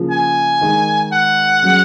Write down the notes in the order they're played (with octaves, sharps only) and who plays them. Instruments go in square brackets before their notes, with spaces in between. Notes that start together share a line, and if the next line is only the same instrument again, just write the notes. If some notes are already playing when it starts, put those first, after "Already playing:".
Already playing: [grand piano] C#3 F3 A#3 F4
[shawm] G#5
[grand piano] D#3 G#3 D#4
[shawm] F#5
[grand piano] F#3 C#4 G#4